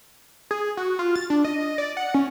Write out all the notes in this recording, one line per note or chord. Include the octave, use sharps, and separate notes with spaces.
G#4
F#4
F4
A6
D4
D#5
D5
F#5
C#4